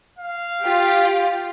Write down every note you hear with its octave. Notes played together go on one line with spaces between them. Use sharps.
F5
F4 G4